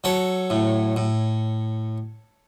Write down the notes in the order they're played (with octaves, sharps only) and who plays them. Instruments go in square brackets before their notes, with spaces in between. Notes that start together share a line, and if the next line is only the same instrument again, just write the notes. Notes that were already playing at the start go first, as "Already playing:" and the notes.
[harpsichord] F#3 A4 C#5
A2
A2